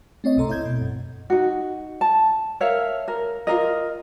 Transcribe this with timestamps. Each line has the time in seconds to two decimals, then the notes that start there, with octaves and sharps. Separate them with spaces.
0.24 A3 C4 C#5 D#5
0.36 G1 C#2 C3 A4 A#5 C6
0.49 E4 D#5 G6 G#6
0.65 B2
0.82 F#2
1.30 D#4 F#4
2.01 A5
2.60 A#4 C#5 E5 F5
3.08 A#4
3.47 F4 G#4 A#4 D#5